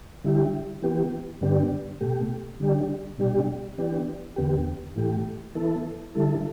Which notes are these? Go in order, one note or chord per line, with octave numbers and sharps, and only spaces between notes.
D3 G3 E4 G4
E3 B3 G4
G2 D3 B3 D4 G4
B2 A3 G4
D3 G3 D4 G4
B2 G3 D4 G4
E3 B3 D4 G4
E2 D3 B3 G4
A2 E3 A3 G4
E3 B3 E4 A4
D3 G3 E4 A4